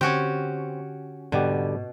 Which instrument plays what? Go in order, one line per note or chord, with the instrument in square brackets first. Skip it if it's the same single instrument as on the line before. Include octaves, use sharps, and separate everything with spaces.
[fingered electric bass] D3 [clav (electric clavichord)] C4 [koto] C#4 F#4 G4
[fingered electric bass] G#2 B3 [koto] B2 [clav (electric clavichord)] D3 G3 G4